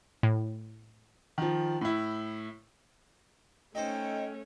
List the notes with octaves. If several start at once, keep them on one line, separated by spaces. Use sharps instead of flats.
A2
D#3 F3
A2 E4
A3 C#4 D#4 A4 C5 G5